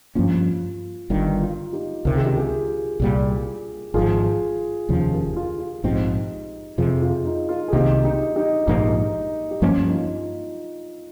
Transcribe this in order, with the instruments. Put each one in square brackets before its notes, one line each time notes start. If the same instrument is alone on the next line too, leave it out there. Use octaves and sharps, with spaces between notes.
[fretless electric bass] G2 F3 A#3 C#4 [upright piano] F4
[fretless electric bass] G1 G2 D#3 [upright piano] F4
[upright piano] F4
D#4 G4
[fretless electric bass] C#2 C3 D#3 [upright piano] A#4
[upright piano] G#4
G4
F4 G#4
[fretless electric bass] C2 A#2 G3
[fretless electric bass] G#1 G#2 F3 [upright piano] F4 G#4
[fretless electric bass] F1 D#2 C#3 F3
[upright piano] G4 A#4
F4
F4
[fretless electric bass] A#1 G#2 F3 C4 [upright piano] D#4 G4
[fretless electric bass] F2 C3 F3 [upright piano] F4 G#4
[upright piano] F4
D#4
F4
G#4
[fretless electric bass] C2 C3 D#3 A#3 [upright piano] D#4 G4
[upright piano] D#4 G4
D#4 G4
[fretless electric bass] A#1 G#2 F3 A#3 [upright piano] D#4
[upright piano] G4
[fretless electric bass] G2 F3 A#3 C#4 [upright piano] F4
[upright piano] D#4
F4